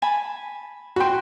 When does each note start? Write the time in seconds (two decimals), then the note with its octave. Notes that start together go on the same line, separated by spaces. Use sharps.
0.02 G#5 A5 B5
0.96 F#4 G5 B5 C6